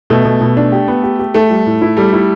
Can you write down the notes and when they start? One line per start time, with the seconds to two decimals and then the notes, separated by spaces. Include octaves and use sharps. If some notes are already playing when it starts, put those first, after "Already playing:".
0.10 B2 A3
0.25 B2
0.41 B2
0.57 D4
0.72 G4
0.88 B3
1.04 G4
1.19 G4
1.34 A3 A4
1.50 G3
1.66 A2
1.82 E4
1.97 G3 A4
2.13 E4